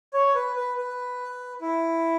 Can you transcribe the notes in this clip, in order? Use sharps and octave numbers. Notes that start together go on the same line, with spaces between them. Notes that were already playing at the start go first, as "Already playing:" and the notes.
C#5
B4
B4
B4
E4